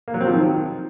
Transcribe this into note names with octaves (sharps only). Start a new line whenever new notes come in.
A#3
F#3
C4
F3
D#3